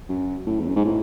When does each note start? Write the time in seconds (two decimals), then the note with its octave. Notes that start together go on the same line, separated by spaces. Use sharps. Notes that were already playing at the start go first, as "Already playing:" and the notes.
0.09 F#2
0.46 A2
0.60 E2
0.68 F#2
0.76 G#2
0.85 A2